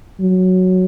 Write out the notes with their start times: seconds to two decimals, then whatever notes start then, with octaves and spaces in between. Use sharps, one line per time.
0.20 F#3